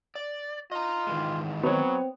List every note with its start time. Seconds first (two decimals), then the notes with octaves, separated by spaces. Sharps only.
0.15 D5
0.72 F4 D#5 A#5
1.07 D#3 E3 G#3
1.63 F#3 B3 C4 C#5